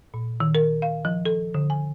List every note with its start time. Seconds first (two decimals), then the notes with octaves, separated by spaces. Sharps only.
0.14 A#2
0.40 D#3
0.55 A#4
0.82 F5
1.05 F3
1.25 A4
1.54 D3
1.70 G#5